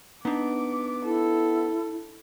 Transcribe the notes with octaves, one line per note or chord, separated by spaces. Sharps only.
B3 D4 D#4 D6
E4 A4